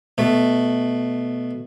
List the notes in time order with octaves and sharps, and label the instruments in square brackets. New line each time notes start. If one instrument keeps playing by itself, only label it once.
[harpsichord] B2 A3